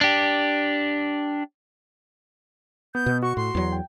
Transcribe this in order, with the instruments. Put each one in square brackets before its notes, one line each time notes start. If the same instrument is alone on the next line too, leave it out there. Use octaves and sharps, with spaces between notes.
[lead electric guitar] D4 G4
[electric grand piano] B3 [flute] G6
[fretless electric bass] B2
[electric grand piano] F#4 [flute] C#6
[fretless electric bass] A2 [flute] C6
[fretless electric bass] E2 F#3
[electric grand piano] G5